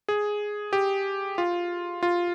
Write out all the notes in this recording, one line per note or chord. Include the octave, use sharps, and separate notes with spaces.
G#4
G4
F4
F4